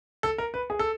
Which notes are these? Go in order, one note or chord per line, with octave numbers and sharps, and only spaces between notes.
A4
A#4
B4
G#4
A4